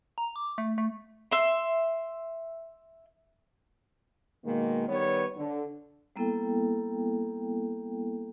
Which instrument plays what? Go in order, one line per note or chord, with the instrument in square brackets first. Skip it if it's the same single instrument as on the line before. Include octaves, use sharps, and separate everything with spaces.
[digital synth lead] A#5
D6
A3
A3
[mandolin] E5 C6
[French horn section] B2 D#3 G#3 A#3
D#3 G3 B3 B4 C#5
D3
[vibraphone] G3 A#3 B3 E4 A4 G5